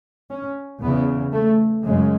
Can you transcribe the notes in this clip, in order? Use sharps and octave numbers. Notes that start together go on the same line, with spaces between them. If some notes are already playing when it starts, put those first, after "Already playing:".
C#4
E2 C#3 B3
A3
F#2 C#3 G#3